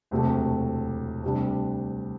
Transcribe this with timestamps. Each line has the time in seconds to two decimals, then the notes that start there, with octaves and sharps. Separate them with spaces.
0.11 E1 D2 C3 F#3 A3
1.23 D2 C3 G3 D4